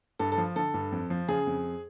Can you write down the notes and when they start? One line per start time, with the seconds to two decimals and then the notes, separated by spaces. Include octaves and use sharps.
0.19 G2 A4
0.32 A4
0.38 F3
0.56 D3 A4
0.74 G2
0.92 F2
1.10 F3
1.28 C#3 G#4
1.47 F2